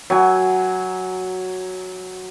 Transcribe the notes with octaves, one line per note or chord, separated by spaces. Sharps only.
F#3 G#5